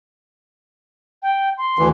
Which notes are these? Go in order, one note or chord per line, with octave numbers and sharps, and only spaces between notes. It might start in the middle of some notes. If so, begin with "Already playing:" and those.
G5
C6
D2 E3